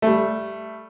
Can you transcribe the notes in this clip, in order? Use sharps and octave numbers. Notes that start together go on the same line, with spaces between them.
G3 A3